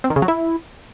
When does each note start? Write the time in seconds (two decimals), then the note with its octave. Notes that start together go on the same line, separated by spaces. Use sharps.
0.04 C4
0.10 D#3
0.16 C#3
0.22 F#3
0.28 E4